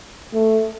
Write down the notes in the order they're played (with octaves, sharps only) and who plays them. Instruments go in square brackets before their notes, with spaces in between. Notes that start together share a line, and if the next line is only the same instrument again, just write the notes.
[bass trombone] A3